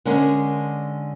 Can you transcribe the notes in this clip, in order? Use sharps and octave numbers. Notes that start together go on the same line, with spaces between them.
D3 G#3 C#4 A#4